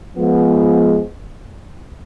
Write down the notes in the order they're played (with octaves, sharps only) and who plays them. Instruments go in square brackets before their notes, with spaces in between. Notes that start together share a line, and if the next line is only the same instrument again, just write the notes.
[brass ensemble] F3 G#3 B3